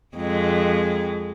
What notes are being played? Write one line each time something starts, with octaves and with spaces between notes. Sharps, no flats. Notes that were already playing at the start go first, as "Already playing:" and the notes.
F2 G#3